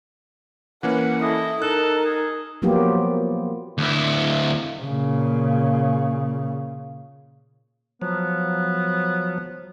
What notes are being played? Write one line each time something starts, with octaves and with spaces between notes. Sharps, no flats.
E3 A#3 C#4 B4 F#5
E4 A4 D#5
D#4 A4 A#4 F#6
G#4
F3 F#3 A#3 B3 F4 G4
D2 E4
A#2 C#3
F3 F#3 B3